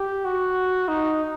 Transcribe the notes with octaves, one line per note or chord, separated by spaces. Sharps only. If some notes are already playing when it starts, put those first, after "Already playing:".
Already playing: G4
F#4
D#4